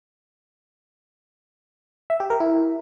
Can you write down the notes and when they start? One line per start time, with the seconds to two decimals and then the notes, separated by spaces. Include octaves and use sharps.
2.10 E5
2.20 G4
2.30 A#4
2.40 E4